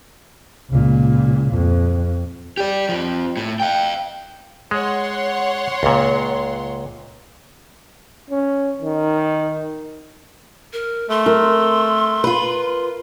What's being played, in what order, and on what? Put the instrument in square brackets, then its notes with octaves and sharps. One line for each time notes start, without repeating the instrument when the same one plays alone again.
[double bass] C#2 A#2
F2
[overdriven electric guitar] G4 D5
F2 F3
A2
F5 G5
[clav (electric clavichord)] G#3 [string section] C#5 F#5 C6
[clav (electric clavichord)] C#2 A#2
[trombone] C#4
D#3
[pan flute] A#4
[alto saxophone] A3 [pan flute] C6
[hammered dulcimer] A#4
[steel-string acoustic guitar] F4 B4